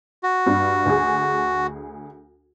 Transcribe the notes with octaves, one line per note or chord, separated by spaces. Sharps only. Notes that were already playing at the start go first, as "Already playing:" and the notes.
F#4
G2
D2 G#4